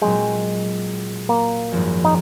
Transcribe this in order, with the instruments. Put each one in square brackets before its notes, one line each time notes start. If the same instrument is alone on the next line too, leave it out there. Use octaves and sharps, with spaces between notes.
[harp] A#2 F#3 C4 [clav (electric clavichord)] G#3
[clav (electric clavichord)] A#3
[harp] G#1 F#2 F3 G#3
[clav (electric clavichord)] D#4